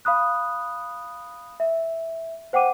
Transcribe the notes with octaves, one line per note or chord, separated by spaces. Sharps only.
F5 B5 D#6 F#6
E5
C5 F#5 G5 D6 D#7